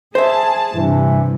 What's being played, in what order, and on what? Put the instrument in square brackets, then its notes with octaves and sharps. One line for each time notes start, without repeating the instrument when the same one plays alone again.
[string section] G#4 A5 [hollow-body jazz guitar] C5 E5
[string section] G2 [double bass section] C3 [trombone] E3